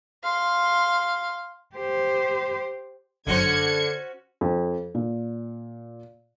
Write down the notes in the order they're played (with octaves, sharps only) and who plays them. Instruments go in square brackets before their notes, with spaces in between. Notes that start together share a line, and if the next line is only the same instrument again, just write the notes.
[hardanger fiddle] F5 C6
[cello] G4 C5
[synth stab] G1 F#2 [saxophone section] D3 [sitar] C#4 F#4 C5 [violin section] G#6 C#7
[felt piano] F2
A#2